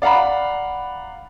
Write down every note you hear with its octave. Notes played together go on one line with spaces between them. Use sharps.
D5 F5 F#5 A#5 B5